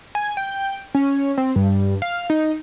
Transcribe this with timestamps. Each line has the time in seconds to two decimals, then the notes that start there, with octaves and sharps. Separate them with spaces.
0.15 G#5
0.37 G5
0.95 C#4
1.38 C4
1.56 G2
2.02 F5
2.30 D#4